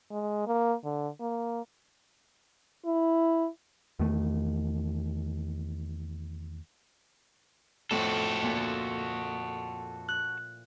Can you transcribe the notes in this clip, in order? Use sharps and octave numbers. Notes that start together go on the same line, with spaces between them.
G#3
A#3
D3
A#3
E4
E2 D#3 A3
F2 A2 F#4 A4
A#2
F#6